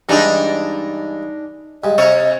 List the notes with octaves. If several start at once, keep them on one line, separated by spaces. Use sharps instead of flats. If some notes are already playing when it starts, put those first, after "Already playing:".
G2 E3 G#3 D4 D#4
G2 G#3 D#5
C3 C#5 E5 F5 A#5